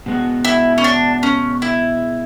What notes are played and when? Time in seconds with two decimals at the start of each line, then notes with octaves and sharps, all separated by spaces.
0.06 B2 G#3 B3 F#4
0.45 E4
0.78 C#4
0.84 D4
1.23 C#4
1.62 E4